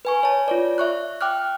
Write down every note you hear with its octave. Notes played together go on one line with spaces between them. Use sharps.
B4 G#5 C#6
C#5 A5
F4 C#5 D5
E5 C#6 F#6
G5 D6 F6 F#6